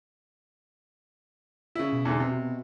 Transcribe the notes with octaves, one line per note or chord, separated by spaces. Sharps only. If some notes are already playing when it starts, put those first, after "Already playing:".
C#3 E4
B2
E2 G#2 D3
C3